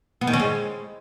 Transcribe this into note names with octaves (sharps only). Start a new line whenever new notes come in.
B3
D#3
C#4
G#3